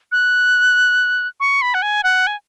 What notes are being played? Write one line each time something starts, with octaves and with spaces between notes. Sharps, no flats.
F#6
C#6
B5
F#5
G#5
F#5
G#5